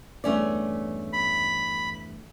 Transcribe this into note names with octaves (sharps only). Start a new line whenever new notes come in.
E2 G2 E3 A3 C#4 D5
B5